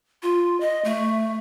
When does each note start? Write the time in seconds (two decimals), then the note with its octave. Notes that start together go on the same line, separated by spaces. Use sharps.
0.23 F4
0.60 D#5
0.85 A3